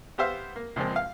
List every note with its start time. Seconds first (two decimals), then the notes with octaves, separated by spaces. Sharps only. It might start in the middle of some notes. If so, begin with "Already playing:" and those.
0.18 B3 G4 C5 E5 F5
0.56 A#3
0.76 C#2 A#2 F3 G#3 C4
0.96 F5